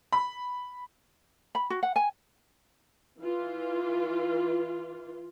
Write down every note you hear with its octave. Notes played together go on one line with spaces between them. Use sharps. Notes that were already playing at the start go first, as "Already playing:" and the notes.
B5
B5
F#4
F#5
G#5
E3 F4